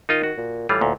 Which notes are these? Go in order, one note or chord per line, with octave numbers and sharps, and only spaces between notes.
D#3 D#4 F4 D#5
F#4
A#2
A2 E3 G3 F4
D2 A#2